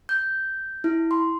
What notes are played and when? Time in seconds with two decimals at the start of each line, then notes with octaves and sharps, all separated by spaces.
0.09 G6
0.84 E4
1.11 C6